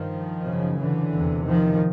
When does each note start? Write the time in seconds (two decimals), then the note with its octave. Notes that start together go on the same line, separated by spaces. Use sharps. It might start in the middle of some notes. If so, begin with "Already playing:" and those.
Already playing: G2 D#3 F3
0.46 F#2 C#3
0.79 D3 E3
1.13 E2 C3
1.46 D#3 F3